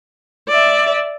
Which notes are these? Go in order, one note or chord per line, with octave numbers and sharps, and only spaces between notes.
D5 E5